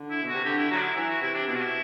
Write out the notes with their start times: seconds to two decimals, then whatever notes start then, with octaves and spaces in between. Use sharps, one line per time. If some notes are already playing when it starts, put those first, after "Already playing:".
Already playing: D3
0.11 E4
0.22 B2
0.28 F#4
0.34 C3
0.45 D3 G4
0.58 E4
0.71 F#3 F#4
0.77 D4
0.83 E4
0.96 E3 E4
1.09 F#4
1.22 C3 E4
1.34 D4
1.48 B2 E4
1.55 F#4
1.62 E4